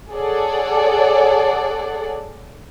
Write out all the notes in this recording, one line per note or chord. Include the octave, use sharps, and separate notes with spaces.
G#4 A4 C#5 D5 F#5